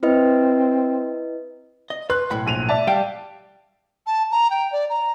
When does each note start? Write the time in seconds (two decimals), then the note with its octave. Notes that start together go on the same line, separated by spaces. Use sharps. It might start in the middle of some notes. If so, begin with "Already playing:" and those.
0.03 C4 E4 B4 D#5
1.90 D#5
2.10 B4 C6 F#6
2.31 B1 A2 B5
2.46 A#1 D#7 F7
2.69 D5 E5 A5
2.87 G3 F5 G5
4.07 A5
4.31 A#5
4.50 G5
4.72 D5
4.90 A#5